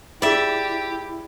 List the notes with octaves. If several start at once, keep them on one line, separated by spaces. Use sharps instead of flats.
E4 F4 G4 G#4 D5 E5